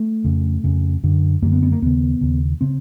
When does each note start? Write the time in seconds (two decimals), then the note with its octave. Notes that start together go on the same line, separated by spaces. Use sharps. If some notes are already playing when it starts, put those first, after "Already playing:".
Already playing: A3
0.24 F2 C#3
0.64 F2 C#3
1.03 F#2 D3
1.42 F#2 A#3
1.45 D3
1.52 B3
1.63 B3
1.72 A#3
1.82 D#2 C#3 B3
2.21 D#2 C#3
2.61 C#3 C4